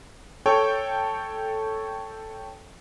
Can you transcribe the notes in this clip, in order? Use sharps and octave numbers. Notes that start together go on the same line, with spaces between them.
A4 C#5 G5